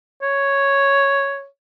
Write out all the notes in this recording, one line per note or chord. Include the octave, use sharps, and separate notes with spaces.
C#5